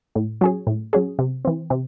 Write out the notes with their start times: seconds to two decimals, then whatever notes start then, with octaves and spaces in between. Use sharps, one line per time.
0.15 A2
0.41 F#3 C#4 G#4
0.67 A2
0.93 F#3 C#4 G#4
1.19 C3
1.45 E3 C4
1.70 C3